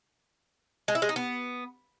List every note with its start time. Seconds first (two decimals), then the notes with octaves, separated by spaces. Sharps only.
0.88 G#3
0.95 E4
1.02 G#3
1.09 D#4
1.16 B3